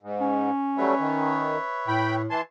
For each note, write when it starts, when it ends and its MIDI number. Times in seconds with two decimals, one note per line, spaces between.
0.03 0.51 44
0.21 1.65 61
0.77 0.94 54
0.77 0.94 55
0.77 0.94 57
0.77 2.22 71
0.77 2.22 73
0.77 2.22 76
0.99 1.57 51
1.88 2.28 45
1.88 2.16 79
1.88 2.16 83
2.30 2.41 52
2.30 2.43 80
2.30 2.41 81
2.30 2.41 84